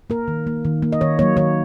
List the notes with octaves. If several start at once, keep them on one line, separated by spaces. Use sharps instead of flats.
A#3 A#4
D#3
A#3
D#3
A#3
D#5
D#3 C#5
F#3 A#3 C#5
D#3 C#5